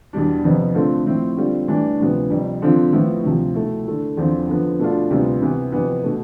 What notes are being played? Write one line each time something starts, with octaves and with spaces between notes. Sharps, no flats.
E2 B2 G3 D4
F2 C3 F3 B3
D3 A3 C4 F4
A2 F3 C4 E4
D3 G3 C4 F4
A2 E3 G3 D4
D2 C3 F3 B3
F2 C3 G3
D3 F3 C4 F4
A2 F3 B3 E4
D2 C3 F3
B2 A3 E4
D3 A3 E4
E2 D3 F3 C4 F4
D3 F3 B3
B2 A3 D4 F4
D2 C3 G3 B3 F4
C3 E3 B3
F2 C3 E3 B3
B2 A3